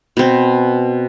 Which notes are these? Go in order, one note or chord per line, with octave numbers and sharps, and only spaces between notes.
B2 C4